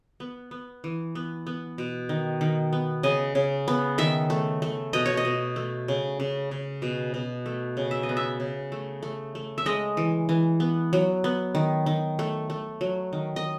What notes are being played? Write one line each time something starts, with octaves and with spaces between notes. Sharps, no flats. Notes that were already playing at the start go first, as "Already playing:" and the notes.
B3
B3
E3
B3
B3
B2
D#3
D#3
B3
C#3 D#5
C#3
B3
D#3 E5
A3
A3
B2 D#5
C#5
D#5
B2
A3
C#3
C#3
C#3
B2
B2
A3
C#3
E5
D#5
B3
E5
C#3
A3
A3
A3
E5
G#3 D#5
E3
E3
B3
F#3
B3
D#3
D#3
A3
A3
F#3
D#3
D#5